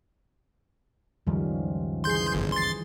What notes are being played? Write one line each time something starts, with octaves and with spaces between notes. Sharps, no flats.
C#2 F#2 D#3 F3 G3
E3 G#4 C6 G6
G1
C6 A6